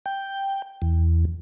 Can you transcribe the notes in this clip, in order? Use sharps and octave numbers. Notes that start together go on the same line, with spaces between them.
G5
E2